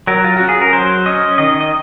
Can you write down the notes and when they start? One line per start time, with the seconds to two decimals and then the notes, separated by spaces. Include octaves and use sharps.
0.07 F#3 A#4
0.24 F4
0.37 C#4 F#4
0.49 G#4
0.62 A#4
0.73 F#3 C5
1.06 C#4 D#5
1.38 D#3 D#5
1.61 D#5